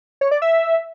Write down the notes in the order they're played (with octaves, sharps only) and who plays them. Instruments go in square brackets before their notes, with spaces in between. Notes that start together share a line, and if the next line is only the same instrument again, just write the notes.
[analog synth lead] C#5
D5
E5